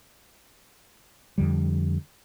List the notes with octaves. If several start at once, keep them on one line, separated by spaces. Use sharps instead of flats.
F2 D3 G3